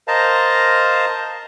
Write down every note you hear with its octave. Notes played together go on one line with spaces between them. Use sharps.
A#4 C5 D#5 F5 A5 A#5